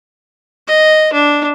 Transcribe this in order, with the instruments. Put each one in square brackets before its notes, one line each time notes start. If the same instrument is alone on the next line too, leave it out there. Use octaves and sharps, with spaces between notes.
[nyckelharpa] D#5
D4